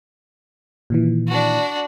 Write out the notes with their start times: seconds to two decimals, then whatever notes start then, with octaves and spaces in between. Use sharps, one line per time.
0.90 A#2 D#3 E3
1.28 D4 F#4